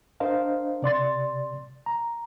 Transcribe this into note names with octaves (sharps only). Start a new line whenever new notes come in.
D4 A#4 C5 D#5 F5
C3 D5 C6 A6
A#5